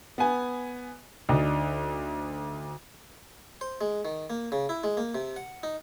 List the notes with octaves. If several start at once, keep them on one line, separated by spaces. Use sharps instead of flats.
B3 G#5
D2 D4 D#4
C5
G#3
D#3
A#3
C#3
E4
G#3
A#3
C3
F#5
D#4